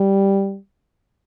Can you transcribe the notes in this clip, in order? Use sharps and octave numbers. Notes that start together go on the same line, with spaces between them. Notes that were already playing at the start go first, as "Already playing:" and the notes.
Already playing: G3